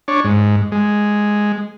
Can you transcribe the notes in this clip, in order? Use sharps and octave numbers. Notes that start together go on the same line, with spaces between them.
D4 C#5
G#2
G#3